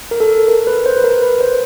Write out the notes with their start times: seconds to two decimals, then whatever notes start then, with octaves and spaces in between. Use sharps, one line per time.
0.11 A#4
0.20 A4
0.48 A#4
0.67 B4
0.86 C5
0.97 B4
1.04 A#4
1.22 B4
1.41 C5